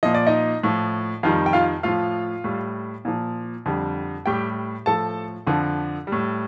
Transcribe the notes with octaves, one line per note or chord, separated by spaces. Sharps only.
A#2 F3 D#5
D5
D#4 D#5
A2 F3
F2 D#3 G3 F4 F5
G5
F4 F5
A2 F3 F4 F5
A2 G3
A#2 F3
F2 D3 G3
A2 G3 G4 G5
A2 F3 A4 A5
F2 D3 F3
G3
A2